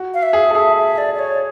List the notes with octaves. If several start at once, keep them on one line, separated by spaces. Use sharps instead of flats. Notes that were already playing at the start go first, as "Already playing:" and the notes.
Already playing: F#4
F5
E5
G#4
A4
G#4 E5
E5
D5
D5
C#5